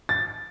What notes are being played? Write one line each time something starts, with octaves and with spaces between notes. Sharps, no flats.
A6